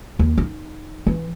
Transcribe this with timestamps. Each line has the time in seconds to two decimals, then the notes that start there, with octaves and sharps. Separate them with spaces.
0.19 D#2
0.38 D#4
1.07 E3